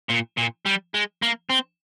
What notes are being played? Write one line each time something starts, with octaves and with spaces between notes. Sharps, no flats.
A#2
A#2
G3
G#3
A#3
C4